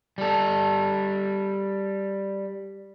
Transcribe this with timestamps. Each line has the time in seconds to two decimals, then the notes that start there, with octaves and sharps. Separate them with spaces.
0.18 G3 A4